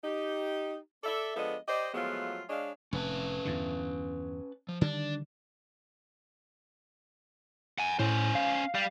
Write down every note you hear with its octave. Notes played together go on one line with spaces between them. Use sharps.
D#4 G4
A4 D5 E5
F3 G#3 B3 D4 A4 D#5
G4 C5 D5 D#5
F3 F#3 G#3 A3 B3 F4
G#3 D4 G#4 C#5 D#5 F5
F1 C#4 B4 A5
E2 G2 D3
F3
D3 D#3 G3 D4
F#5 G#5
A2 C#4 C5
F5
G3 F5